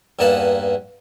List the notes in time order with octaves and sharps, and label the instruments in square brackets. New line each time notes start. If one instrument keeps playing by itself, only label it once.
[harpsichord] E2 G2 A#3 D#4 F#5 A5